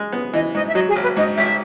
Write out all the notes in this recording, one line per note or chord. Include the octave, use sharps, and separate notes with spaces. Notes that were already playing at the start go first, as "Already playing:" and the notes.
Already playing: G#3
B3
E3 D#5
G#2 D#5
E5
F#3 D#5
G#4
G#1
B4
G#2 D#5
G#1 E5